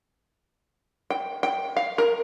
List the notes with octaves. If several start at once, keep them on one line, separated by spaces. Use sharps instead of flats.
G5
G5
F5
A#4